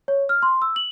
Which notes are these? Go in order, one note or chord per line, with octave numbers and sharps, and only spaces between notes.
C#5
F6
C6
E6
F#7